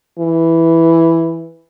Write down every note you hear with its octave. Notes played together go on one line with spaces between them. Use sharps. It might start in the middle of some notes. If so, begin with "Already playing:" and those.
E3